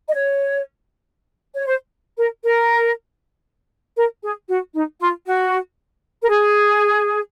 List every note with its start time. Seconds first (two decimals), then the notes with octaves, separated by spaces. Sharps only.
0.07 D#5
0.13 C#5
1.55 C#5
1.66 C5
2.17 A#4
2.43 A#4
3.96 A#4
4.22 G#4
4.48 F#4
4.73 D#4
4.99 F4
5.25 F#4
6.22 A#4
6.28 G#4